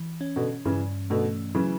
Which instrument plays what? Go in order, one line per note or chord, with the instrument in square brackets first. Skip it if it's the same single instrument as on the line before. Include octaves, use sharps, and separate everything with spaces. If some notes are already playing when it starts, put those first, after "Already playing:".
Already playing: [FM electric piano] E3
C#4
[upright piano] B2 D3
[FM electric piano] G2 [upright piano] C#3 E3
[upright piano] B2 D3 [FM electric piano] A3
[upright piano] C#3 E3 [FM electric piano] F#3